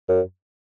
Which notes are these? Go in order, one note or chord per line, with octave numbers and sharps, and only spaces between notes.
F#2